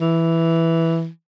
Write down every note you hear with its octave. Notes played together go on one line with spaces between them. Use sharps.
E3